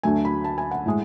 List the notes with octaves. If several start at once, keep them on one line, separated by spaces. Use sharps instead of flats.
D2 D3 F#3 A3 G#5
B5
A5
G#5
F#5
A2 G#3